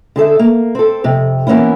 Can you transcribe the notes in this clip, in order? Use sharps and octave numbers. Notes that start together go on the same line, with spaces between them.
D3 G#4 A4 E5
A#3
C4 A4
F2 C3
E3 A#3 B3 C#4 E4